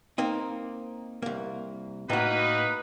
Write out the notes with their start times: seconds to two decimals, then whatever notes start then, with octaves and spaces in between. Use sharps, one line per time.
0.18 A#3 C4 D#4
1.22 C2 A#3
2.10 A2 A#3 D#4 F#4 B4